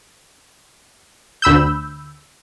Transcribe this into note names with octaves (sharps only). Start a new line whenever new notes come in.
D2 B5 E6 G6